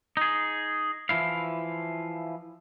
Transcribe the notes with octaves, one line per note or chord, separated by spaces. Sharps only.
D#4 G#4
E3 F3 E4 F5